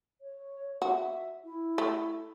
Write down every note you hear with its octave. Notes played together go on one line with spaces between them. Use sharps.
C#5
F#4 E5
E4
A3